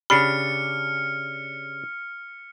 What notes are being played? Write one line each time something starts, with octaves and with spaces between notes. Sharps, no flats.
C#3 D4 G4 B5 F6 C#7